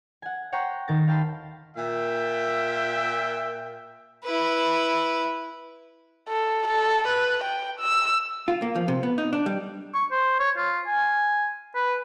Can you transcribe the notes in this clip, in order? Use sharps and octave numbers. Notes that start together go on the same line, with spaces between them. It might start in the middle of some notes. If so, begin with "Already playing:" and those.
F#5 G#5
C#5 F#5 G5 A#5 C6 C#6
D#1 D#3 A#4 A6 A#6
F5 G5 A5 B5 C6
A#2 E5 G5
E4 B4
A4
A4
B4
G5
E6
F4
A#3
F3
C3
B3
D#4
D4
G3
C#6
C5
C#5
F4
G#5
B4